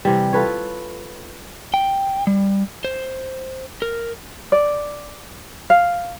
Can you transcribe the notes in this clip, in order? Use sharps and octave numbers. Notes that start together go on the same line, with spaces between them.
C3 E3 G3
F4 A4 B4 C#5
G5
G3
C5
A#4
D5
F5